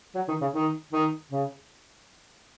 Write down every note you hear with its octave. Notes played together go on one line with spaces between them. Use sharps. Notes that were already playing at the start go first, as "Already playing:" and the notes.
F#3
D#3
C#3
D#3
D#3
C#3